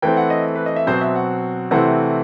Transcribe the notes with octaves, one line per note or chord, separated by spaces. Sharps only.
E3 A3 C4 G5
F#5
D#5
B4
D#5
E5
B2 F#3 C4 C5
E5
F#5
C3 E3 A3 C4 F#5